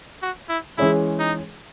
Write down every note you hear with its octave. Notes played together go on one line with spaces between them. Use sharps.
F#4
E4
E3 G#3 C#4 E4 G#4
D#4